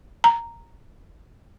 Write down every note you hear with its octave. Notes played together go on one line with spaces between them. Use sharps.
A#5